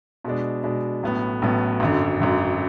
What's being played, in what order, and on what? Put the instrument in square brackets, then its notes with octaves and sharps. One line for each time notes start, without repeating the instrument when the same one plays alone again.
[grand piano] B2 G#3 D4
B2 G#3 D4
A1 A2 F#3 B3
A1 A2 F#3 B3
G#1 F#2 D3
G#1 F#2 D3